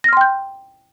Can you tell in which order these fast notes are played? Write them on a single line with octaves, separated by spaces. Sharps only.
A#6 F6 C6 G5 G6